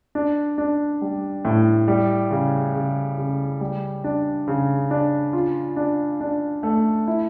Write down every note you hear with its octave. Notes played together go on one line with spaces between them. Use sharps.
D4
D4
G3
A2
G3
C#3
C#3
C#3
G3
D4
C#3
D4
F4
D4
D4
A3
E4